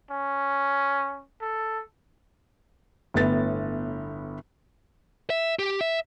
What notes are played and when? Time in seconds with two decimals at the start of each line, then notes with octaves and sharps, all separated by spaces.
0.11 C#4
1.41 A4
3.14 G1 A2 B3 A6
5.30 E5
5.59 G4
5.81 E5